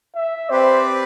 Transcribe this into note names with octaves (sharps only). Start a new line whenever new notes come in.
E5
C4 G4 B4 C5 D5